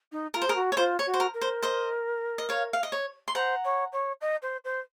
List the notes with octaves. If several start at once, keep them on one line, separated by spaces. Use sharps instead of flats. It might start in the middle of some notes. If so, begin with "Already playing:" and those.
D#4
F4 A#4
C5
G#4 A#4
F#4
C#5
F4 C5
C#5
F#4
C5
A#4
A#4
C5
C5 D#5
D#5
C#5 F5
F5
D#5
C#5
C6
C5 F#5 A#5
C#5
C#5
D#5
C5
C5